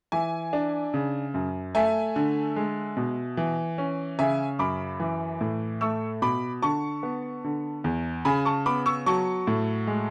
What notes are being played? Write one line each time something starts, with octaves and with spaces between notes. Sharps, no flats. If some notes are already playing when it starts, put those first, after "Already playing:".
E3 E5 G#5
D4
C#3
F#2
A3 E5 G#5
D3
G#3
B2
E3
C#4
C#3 E5 G#5
F#2 B5 D6
E3
A2
A3 C#6 E6
B2 B5 D6
D3 A5 C#6
B3
D3
E2
C#3 G#5 B5
A5 C#6
B3 B5 D6
C#6 E6
F#3 A5 C#6
A2
G#3